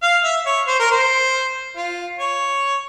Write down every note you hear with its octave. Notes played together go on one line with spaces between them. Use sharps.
F5
E5
C#5
C5
A#4
C5
F4
C#5